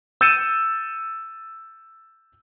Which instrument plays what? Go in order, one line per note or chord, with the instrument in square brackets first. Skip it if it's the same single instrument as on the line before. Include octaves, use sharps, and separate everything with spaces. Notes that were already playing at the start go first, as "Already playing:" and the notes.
[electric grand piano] E6 G6 A6 C#7 D#7 E7